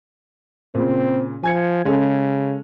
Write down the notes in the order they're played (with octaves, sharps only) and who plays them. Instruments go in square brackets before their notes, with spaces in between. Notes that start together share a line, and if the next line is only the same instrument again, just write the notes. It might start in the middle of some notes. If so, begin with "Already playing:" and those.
[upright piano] A#2 C#3 [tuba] C4
[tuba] F3 [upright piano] G#5 G#6 C#7
[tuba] C#3 [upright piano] G#3 C#4 A4